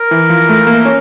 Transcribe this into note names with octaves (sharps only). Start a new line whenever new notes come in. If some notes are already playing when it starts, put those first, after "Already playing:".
Already playing: A#4
E3
F3
A3
A#3
C#4